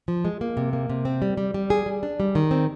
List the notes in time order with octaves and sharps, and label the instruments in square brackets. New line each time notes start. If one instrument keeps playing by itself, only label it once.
[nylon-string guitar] F3
G#3
A#3
C3
A#3
C3
C4
G3
G3
G3
G#4
G3
D4
G3
D#3
C4